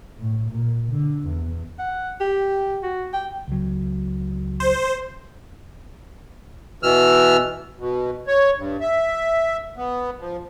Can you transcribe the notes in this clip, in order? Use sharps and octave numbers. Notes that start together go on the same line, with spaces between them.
A2
A#2
D3
E2
F#5
G4
F#4
G5
C#2 F#3
C5
B2 E3 E6 F6
B2
C#5
G2
E5
B3
F3